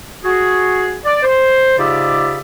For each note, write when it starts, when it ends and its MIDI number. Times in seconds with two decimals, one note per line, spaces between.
0.24 0.96 66
0.24 0.96 68
1.05 1.23 74
1.23 1.75 72
1.78 2.40 44
1.78 2.40 49
1.78 2.40 65
1.78 2.40 67
1.78 2.40 74
1.78 2.40 76